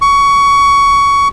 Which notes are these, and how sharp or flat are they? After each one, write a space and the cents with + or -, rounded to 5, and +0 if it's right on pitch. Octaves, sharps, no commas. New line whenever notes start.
C#6 +20